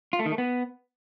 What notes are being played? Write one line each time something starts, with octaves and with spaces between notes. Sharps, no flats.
F4
A3
D#3
A3
B3